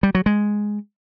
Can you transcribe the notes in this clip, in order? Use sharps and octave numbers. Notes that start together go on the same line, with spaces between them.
G3
F#3
G#3